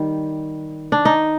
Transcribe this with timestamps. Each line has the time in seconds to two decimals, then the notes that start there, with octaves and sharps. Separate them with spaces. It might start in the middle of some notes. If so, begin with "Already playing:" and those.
Already playing: D#3 G3
0.92 D4
1.05 D#4